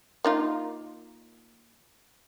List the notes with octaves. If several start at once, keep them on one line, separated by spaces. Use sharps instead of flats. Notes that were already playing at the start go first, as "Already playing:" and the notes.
A#3 D#4 F4